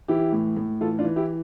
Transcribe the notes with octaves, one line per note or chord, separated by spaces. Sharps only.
E3 E4 G4
A2
A2
E3 F4 A4
D4 F4
E3
E4 G4